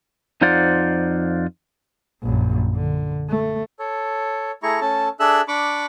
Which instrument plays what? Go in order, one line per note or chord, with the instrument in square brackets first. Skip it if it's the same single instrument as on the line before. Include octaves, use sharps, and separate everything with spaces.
[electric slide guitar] F2 D#4 F4 C5 D5 F#5
[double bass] A#1 F#2
D3
A3
[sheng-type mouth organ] A4 C#5
A3 E4 G#4 A#5 C#6
A3 C#4 A4 A5
D4 G#4 A4 E5 E6 F#6
D4 B5 C#6 D6